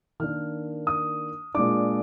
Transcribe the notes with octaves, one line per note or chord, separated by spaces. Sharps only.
D#3 A#3 D4 F6
D#6
A#2 G#3 D4 D6